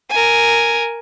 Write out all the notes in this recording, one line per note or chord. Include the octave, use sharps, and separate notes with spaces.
A#4 G#5